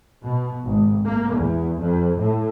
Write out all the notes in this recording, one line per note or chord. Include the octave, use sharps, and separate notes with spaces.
B2
G#1
A#3
E2
F2
A2